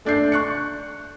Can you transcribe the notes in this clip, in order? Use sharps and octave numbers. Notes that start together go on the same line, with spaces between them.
A3 D4 G6 C7
C#6 F#6 C#7